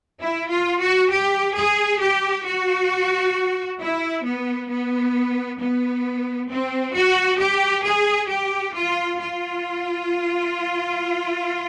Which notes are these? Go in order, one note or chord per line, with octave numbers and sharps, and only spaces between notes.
E4
F4
F#4
G4
G#4
G4
F#4
E4
B3
B3
B3
C4
F#4
G4
G#4
G4
F4
F4